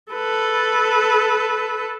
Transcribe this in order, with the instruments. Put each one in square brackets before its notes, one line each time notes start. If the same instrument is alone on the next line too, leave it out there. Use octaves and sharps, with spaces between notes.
[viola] A4 B4